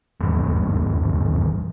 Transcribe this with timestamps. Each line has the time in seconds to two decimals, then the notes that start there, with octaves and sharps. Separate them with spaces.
0.21 D#1 G#1 E2 G2